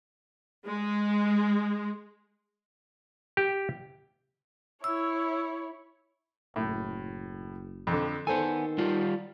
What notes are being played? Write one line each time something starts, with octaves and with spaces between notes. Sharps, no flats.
G#3
G4
E4 C#5 E6
F#1 A2
F2 D3
D#3 B3 A4 C5 G#5
G3 F4